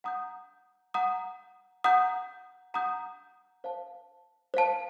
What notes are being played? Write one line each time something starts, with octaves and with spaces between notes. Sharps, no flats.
F#5 A#5 D#6 G6
F#5 A#5 D#6 G6
F#5 A#5 D#6 G6
F#5 A#5 D#6 G6
C5 F5 A5
C5 F5 A5